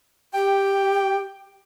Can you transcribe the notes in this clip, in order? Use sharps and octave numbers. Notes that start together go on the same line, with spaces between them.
G4 G5